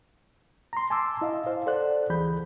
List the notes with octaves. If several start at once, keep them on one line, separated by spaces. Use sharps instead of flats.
A#5 C6
G#5 A5 C6 D6 E6
E4 D#5 F5
C5 F5
A4 C5 D5 F#5 F#6
D2 E3 G#4 B5 G6